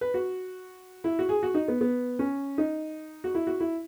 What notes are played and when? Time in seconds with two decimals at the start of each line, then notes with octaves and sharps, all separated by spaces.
0.01 B4
0.14 F#4
1.04 E4
1.19 F#4
1.29 G#4
1.43 F#4
1.54 D#4
1.68 B3
1.81 B3
2.19 C#4
2.58 D#4
3.24 F#4
3.35 E4
3.47 F#4
3.60 E4